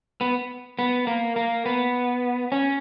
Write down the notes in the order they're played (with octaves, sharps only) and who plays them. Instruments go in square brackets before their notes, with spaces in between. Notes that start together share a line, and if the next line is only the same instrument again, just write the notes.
[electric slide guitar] B3
B3
A#3
A#3
B3
C#4